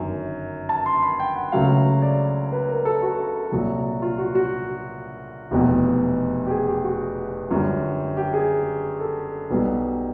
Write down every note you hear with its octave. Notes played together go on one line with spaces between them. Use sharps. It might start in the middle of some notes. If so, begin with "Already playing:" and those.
Already playing: G1 F#2 D#3
A5
C6
B5
G5
F#5
C#2 C#3 F#3 A3 F5
D5
B4
A#4
A4
F#4
C2 A#2 F#3
F4
F#4
F#4
F1 E2 B2 G4
G4
G#4
G4
F#4
F#2 D3 G3 F4
G4
G#4
A4
B1 B2 G3